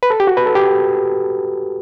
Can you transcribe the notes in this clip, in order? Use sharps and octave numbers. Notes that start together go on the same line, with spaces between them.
B4
A4
G4
F#4
B4
A4
G4